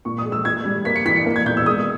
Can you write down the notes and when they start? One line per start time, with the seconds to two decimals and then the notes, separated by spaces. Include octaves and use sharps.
0.05 A#2 C#6
0.18 D#6
0.25 G#3
0.32 E6
0.45 A#2 G#6
0.65 G3
0.85 A#3 B6
0.96 C#7
1.05 E3 B6
1.16 C#7
1.26 A#3
1.36 G#6
1.46 B2 G6
1.57 E6
1.66 G#3 D#6